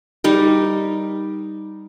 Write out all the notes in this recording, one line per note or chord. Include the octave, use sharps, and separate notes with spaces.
G3 D#4 A#4